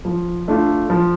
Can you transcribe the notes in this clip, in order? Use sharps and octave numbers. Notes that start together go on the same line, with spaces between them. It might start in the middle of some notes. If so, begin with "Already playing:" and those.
F3
A3 D4 F4
F3